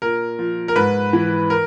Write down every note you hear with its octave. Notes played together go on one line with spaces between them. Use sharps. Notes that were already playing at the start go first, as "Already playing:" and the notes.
A#2 A#4
F3
A#4
G#2 B4
E3
A#4